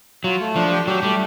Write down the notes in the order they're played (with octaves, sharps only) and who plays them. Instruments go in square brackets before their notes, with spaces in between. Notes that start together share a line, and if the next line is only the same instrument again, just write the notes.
[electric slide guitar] F#3 [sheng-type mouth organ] F4
[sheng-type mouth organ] A3
[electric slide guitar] F3 [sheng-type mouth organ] D4
[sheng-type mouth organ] G4
[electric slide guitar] F#3 [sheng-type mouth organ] G4
[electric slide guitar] G3 [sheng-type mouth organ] A3